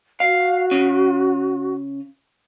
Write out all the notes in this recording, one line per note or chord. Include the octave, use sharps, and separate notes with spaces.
F#4 F5
C#3 C#4